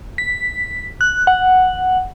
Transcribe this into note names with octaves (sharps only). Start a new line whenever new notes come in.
B6
F#6
F#5